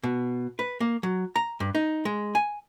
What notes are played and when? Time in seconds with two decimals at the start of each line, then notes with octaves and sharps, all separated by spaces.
0.03 B2
0.59 B4
0.80 A#3
1.03 F#3
1.36 A#5
1.60 G2
1.75 D#4
2.05 G#3
2.35 G#5